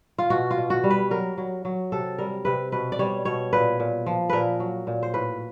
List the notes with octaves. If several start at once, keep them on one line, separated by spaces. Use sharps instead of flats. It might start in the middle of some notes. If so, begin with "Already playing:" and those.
F4
B2 F#4
F4
B2
F#4
G3
B4
F#3 A#4
F#3
F#3
C3 A4
G3 A#4
C3 B4
B2 B4
D5
G3 C#5
B2 C#5
A#2 B4
A#2
F3
A#2 A#4 B4
F#3
A#2
C5
A2 B4